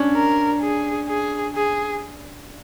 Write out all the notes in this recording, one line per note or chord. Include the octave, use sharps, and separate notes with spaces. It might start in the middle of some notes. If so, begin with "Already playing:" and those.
Already playing: C#4 D4
A#4
G#4
G#4
G#4